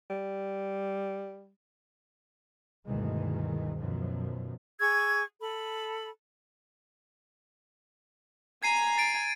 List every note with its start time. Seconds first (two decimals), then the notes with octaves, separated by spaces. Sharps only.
0.10 G3
2.87 D2 G2 B2 D#3 E3 G#3
3.78 F#2 B2 D#3 F3
4.80 G#4 C#6 E6 G#6
5.40 A4 B5
8.63 G#5 A#5 G#6 C7 D#7
8.98 A6 D7